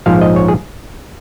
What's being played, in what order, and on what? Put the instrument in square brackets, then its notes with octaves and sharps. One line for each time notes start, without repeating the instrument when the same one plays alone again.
[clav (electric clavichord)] A#1 G#2 F3 F5
D#5
C#5
G#4